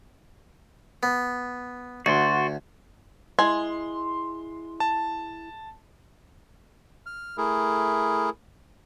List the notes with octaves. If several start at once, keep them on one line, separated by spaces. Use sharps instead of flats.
B3
D2 F#4 D5 C6
G#3 E4 G#5 C6
A5
F6
A3 E4 G#4 A#4